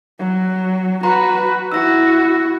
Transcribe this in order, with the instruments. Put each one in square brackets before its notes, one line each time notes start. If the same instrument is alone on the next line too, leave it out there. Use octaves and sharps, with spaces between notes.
[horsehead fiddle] F#3
[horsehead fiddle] F#4 B4 [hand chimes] A#5 C6
[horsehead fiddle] E4 F#4 [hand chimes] E6 A#6